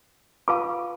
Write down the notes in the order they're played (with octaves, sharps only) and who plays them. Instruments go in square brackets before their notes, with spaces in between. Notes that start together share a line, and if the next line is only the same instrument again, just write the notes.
[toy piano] F4 B4 F5 A5 [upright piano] D6